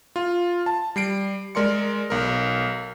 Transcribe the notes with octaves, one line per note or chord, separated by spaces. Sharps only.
F4
A5
G3 C7 D7
G#3 A#4 D5 C6 C#7
B1 A#4